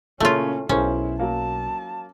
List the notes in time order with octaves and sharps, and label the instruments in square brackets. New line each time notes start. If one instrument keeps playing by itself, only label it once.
[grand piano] A#2 C#3 A#3 [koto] A3 F4 [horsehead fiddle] C#4 [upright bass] E4
[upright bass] B1 [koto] C#4 [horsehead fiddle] E4 [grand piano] G#4 A#4 C5
[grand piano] F#3 A#3 [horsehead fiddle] A5